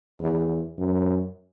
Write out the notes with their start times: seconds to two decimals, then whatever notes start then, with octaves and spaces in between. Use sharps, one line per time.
0.20 E2
0.78 F#2